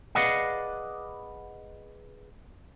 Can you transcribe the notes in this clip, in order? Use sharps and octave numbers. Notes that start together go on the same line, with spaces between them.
G#4 B4 D5 D#5 F5 F#5